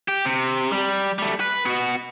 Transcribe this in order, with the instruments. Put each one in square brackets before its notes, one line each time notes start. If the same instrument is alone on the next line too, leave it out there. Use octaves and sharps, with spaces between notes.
[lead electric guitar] G4
C3
G3
G3 A3
B4
B3 F#4